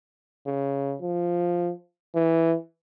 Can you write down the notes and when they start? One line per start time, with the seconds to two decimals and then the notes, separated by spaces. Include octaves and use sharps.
0.46 C#3
1.02 F3
2.15 E3